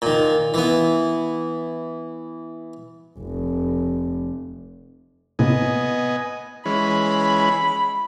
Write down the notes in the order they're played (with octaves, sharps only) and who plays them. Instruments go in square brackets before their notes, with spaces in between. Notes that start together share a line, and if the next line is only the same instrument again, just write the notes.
[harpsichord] A#2 D#3
E3 B3
[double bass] F1
[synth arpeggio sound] A2 C3 A#3 [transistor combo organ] B3 D#5 G#5
[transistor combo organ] E3 G#3 C#4 [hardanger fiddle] B5